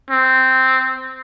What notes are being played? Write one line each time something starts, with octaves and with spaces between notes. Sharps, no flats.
C4